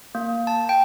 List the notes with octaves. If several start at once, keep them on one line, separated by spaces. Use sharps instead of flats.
A#3
A5
G5